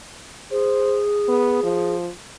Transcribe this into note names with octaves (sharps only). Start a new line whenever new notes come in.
G#4 C5
B3
F3